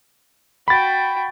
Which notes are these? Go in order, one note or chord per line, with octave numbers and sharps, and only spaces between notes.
F#4 G5 B5 A6